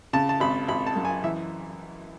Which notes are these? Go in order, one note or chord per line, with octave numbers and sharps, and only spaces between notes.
C#3 A5
A5
G#1 B5
G#1 B5
A5
F#2
G#5
E3 E5